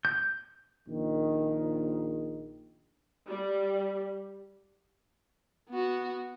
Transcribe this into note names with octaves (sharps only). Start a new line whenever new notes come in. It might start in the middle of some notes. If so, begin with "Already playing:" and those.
G6
A#1 D#3
G3
B3 F#4